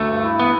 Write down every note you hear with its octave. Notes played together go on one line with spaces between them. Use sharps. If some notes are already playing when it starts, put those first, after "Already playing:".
Already playing: D2 A3
G2
E4
E3 B3